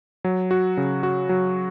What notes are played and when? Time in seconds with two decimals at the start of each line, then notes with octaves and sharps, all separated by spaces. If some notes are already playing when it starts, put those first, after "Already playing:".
0.24 F#3
0.51 F#4
0.77 C#3
1.03 F#4
1.29 F#3